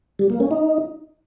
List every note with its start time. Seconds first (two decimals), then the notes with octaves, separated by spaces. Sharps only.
0.19 G3
0.30 A#3
0.40 C#4
0.51 D#4